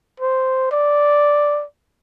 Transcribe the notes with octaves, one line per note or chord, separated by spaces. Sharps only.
C5
D5